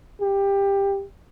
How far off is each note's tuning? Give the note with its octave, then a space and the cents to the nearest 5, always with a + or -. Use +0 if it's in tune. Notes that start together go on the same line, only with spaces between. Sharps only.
G4 +15